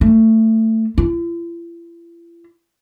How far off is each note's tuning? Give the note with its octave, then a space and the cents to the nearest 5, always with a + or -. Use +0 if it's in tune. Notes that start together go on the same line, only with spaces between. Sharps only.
A3 +20
E4 +45